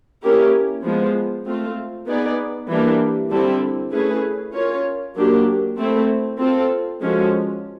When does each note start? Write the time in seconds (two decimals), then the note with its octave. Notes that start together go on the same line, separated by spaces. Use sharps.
0.22 A#3 C#4 E4 G4 A#4
0.84 F3 G#3 B3
1.46 A3 C4 F4
2.07 B3 D#4 G#4 B4 D5
2.69 E3 G3 A#3 D4 G4
3.31 D3 G3 C4 E4 A4
3.92 A3 C#4 E4 G#4 B4
4.54 C#4 F4 A#4 C#5
5.16 F#3 A#3 D4 G4
5.77 A3 C4 E4 A4
6.39 C4 F4 A4
7.01 F3 G#3 C#4 F#4 A4